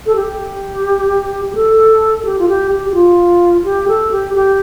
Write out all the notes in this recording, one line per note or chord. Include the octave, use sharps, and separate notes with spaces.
A4
G4
G4
A4
A4
G4
F4
G4
G4
G4
F4
G4
A4
G4
G4